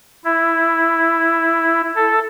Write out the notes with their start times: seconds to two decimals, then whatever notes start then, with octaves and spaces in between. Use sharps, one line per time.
0.25 E4
1.95 A4